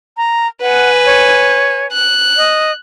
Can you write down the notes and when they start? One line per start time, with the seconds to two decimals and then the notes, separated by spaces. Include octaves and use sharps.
0.17 A#5
0.62 B4 F#5 G#5
1.05 C#5
1.93 F#6
2.37 D#5